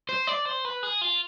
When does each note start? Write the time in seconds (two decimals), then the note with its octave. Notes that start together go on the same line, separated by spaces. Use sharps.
0.09 C5
0.27 D5
0.45 C5
0.65 B4
0.83 G#4
1.01 F4